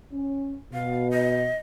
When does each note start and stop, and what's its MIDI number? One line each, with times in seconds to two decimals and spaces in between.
0.12 0.57 61
0.73 1.48 47
0.73 1.11 77
1.11 1.56 75